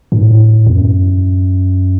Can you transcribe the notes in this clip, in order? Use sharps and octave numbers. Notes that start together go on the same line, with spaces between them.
G2
A2
E2
F#2